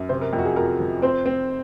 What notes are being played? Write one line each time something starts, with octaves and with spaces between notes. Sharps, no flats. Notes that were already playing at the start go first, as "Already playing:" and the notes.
Already playing: F#2
C3 C5
A#4
F2 A#4
F#4
G#4
F2 A#4
F3
C4 C5
C4